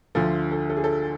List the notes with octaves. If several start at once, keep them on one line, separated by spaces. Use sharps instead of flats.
D2 D3 F3 A4
A4
A4
G#4
A4